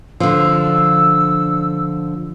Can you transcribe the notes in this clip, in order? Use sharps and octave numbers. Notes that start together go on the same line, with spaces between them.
D3 F3 E6